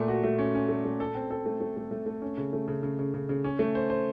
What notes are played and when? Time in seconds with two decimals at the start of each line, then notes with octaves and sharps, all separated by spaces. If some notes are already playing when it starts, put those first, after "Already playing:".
Already playing: A#2 A3
0.08 F#4
0.24 A3
0.39 C#4
0.55 C#4
0.69 A3
0.85 A3
1.00 A4
1.15 C4
1.31 A4
1.46 A3
1.60 A3
1.77 A3
1.91 A3
2.06 A3
2.22 C#4
2.38 C#3
2.53 A3
2.68 C#3
2.83 C#3
2.99 C#3
3.14 C#3
3.29 C#3
3.44 C#4
3.59 A3
3.75 C5
3.90 C5